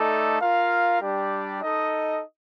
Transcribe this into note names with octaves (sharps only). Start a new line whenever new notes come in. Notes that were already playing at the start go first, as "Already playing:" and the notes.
Already playing: A3 D#4 A4 D5
F4 A#4 F5
G3 D4 G4 D5
D#4 A4 D#5